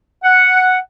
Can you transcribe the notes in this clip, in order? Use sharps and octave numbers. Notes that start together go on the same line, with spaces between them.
F#5